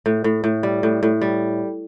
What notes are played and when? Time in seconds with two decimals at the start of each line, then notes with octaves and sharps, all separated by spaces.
0.06 A2
0.24 A2
0.44 A2
0.63 G3
0.83 A2
1.03 A2
1.21 G3